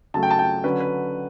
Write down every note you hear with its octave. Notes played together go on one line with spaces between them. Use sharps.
C#3 F#3 A3 A5
G5
A5
G5
D3 F#3 C#4 B4
B4